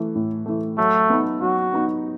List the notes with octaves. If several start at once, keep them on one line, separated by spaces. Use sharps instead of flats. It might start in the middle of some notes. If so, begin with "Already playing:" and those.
Already playing: E3 A3
A2
E3 A3
F#3 A3
B3 D#4
F#3 F#4
B3 D#4